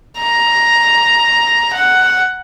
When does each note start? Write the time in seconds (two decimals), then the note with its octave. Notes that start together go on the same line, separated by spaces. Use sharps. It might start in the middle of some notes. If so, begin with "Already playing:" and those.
0.20 A#5
1.73 F#5